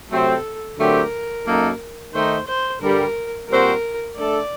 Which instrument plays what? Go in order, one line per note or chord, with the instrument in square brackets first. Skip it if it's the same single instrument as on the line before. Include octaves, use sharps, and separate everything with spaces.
[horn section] C3 F#3 A3 C4 [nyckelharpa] A4
[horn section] D3 F#3 A3 C4 G4 [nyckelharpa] A#4
[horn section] F#2 F#3 A#3 D#4 A4
[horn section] D#3 A3 D#4 [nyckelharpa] C5
[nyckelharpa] C5
[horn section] G2 D3 G3 [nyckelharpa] A#4
[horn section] A#2 G3 C4 F#4 C5 [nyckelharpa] A#4
[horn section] A3 D4 A4 [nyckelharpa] D5